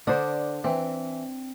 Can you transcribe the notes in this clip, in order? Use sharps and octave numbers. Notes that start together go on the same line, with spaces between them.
D3 D4 C5 D#6
E3 C4